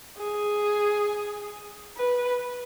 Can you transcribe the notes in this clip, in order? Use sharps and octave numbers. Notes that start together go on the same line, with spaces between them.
G#4
B4